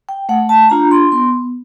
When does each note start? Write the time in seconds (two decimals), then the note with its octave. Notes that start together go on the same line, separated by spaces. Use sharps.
0.09 G5
0.29 A3 F#5
0.49 A5
0.70 D4 F4 A#5
0.91 C6
1.12 B3 C6